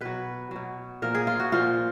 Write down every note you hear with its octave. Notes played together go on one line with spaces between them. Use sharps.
B2 F#3 B4
B2 F#3
A#2 F3 A#4
G#4
F4
F#4
A#2 F3 F4